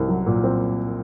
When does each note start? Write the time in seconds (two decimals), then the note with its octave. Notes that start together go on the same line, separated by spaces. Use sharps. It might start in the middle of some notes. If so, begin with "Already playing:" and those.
Already playing: C2 C4
0.08 F#3
0.27 A#2
0.44 C4